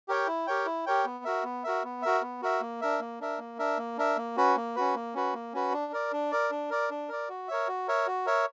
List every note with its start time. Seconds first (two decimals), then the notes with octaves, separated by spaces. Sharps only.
0.08 G4 A#4 C#5 G5
0.27 E4
0.47 G4 A#4 C#5 G5
0.66 E4
0.86 G4 A#4 C#5 G5
1.05 B3
1.24 F#4 A#4 E5
1.44 B3
1.64 F#4 A#4 E5
1.84 B3
2.02 F#4 A#4 E5
2.22 B3
2.42 F#4 A#4 E5
2.61 A#3
2.81 D4 A#4 E5
3.00 A#3
3.20 D4 A#4 E5
3.39 A#3
3.59 D4 A#4 E5
3.78 A#3
3.97 D4 A#4 E5
4.17 A#3
4.37 C#4 F#4 B4
4.56 A#3
4.76 C#4 F#4 B4
4.95 A#3
5.14 C#4 F#4 B4
5.34 A#3
5.53 C#4 F#4 B4
5.73 D4
5.92 A#4 D5
6.12 D4
6.31 A#4 D5
6.51 D4
6.70 A#4 D5
6.90 D4
7.09 A#4 D5
7.29 F#4
7.48 A#4 C#5 E5
7.68 F#4
7.88 A#4 C#5 E5
8.07 F#4
8.26 A#4 C#5 E5